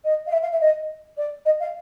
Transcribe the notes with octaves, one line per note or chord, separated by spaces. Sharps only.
D#5
F5
E5
F5
E5
D#5
D5
D#5
F5